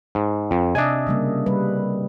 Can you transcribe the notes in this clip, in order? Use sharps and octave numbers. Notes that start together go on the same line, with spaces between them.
G#2
F2
C3 D4 D#5 E5 G#5
C#3 G3 A#3
G3 B4